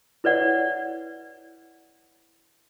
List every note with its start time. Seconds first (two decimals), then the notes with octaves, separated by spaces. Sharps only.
0.24 E4 B4 C#5 D5 F#5